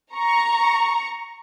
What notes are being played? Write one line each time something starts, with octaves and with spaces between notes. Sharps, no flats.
A#5 C#6